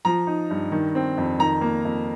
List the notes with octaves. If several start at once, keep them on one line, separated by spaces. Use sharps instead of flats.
F3 A#5
D#4
G2
D#3
C4
F2
D#3 A#5
A#3
F2